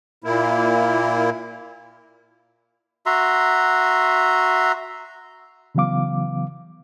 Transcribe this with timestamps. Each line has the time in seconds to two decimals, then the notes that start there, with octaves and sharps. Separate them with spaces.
0.24 A#2 A#3 E4
3.06 F#4 E5 A#5 C6
5.75 C#3 E3 F#3 B3 F5 D6